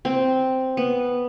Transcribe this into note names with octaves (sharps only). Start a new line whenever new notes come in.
C4
B3